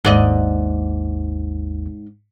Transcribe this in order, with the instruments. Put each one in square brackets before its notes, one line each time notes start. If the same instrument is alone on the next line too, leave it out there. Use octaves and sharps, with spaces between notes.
[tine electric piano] G#1 D#2 [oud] G#2 D5 D#5